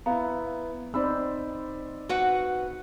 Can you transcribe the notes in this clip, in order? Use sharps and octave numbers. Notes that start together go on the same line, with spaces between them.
B3 E4 F5 A#5
C4 D#4 C5 D5 B5 E6
F#4 B4 F#5